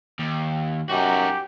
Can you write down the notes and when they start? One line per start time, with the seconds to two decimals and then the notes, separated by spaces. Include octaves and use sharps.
0.19 D#2
0.90 F#2 D#4 F#4 G4